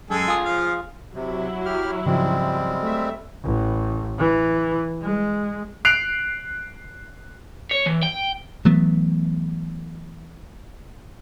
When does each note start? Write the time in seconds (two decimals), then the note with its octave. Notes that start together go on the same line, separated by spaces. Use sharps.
0.10 F#2 G#3 A4 G#5
0.28 F4 G#4
0.45 F3 F5
1.15 C3 F#3 E4
1.66 G4 F6
2.06 G#2 C#3 F3 G3 G#3 C4
2.82 A3 E5
3.45 A1
4.19 E3
5.02 G#3
5.85 F#6 C7 D7 F7
7.71 C#5
7.86 E3
8.03 G5
8.65 E3 F#3 A3 B3